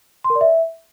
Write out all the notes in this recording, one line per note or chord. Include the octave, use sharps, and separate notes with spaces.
C6
A#4
D5
E5